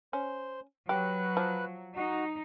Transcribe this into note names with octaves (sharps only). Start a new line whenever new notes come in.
C#4 C5
F#3 G4 B4 F#6
F3
D#4 F#4